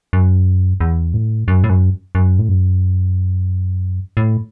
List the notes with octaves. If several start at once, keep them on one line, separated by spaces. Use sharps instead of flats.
F#2
E2
A2
F#2
A2
F#2
F#2
A2
F#2
A2